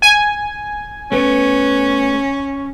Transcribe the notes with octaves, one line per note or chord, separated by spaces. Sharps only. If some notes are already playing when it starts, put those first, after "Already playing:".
G#5
A3 B3 C#4